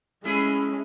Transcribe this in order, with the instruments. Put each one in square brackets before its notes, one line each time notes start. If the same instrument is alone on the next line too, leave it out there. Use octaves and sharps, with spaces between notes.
[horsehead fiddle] G#3 C#4 [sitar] A3 E4 G#4